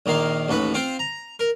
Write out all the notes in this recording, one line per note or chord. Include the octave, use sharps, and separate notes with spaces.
A#1 D#3 A#3 F5
A1 D#2 F#4 B4 B5
C4 F4 C5 G5
A#5
A#4